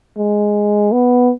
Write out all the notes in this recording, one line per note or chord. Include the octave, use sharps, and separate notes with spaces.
G#3
B3